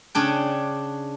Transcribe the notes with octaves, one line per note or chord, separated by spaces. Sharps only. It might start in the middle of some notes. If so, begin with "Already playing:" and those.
C#3 C#4 D4 G5